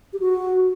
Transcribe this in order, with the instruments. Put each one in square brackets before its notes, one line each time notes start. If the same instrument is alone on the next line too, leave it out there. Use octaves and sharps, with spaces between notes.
[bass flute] G4
F#4